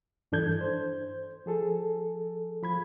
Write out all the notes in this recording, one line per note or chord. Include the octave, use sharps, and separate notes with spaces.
G2 E3 D4 A4 G6 G#6
C5
F3 G#4 A4
F3 B5 G#6